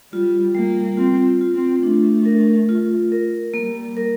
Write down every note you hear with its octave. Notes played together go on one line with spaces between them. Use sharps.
G3 F4
G3 A#3
C4 F4
F4
C4
A3 D4
A#4
F4
A#4
G3 A#3
A#4